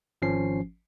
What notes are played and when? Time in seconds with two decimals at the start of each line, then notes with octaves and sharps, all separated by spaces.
0.22 G#1 F3 C#4 C7